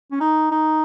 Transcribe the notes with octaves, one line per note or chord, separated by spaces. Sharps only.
C#4
D#4
D#4